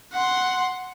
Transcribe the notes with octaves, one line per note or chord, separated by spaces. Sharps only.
F#5 C6